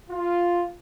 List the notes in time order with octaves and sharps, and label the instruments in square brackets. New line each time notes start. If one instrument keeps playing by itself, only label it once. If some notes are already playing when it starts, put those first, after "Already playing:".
[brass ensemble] F4